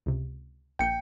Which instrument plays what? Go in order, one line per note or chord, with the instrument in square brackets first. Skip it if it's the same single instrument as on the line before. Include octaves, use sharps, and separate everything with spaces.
[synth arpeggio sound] C#2 C3
[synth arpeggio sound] A#1 A#3 G6 [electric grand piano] G5 C#7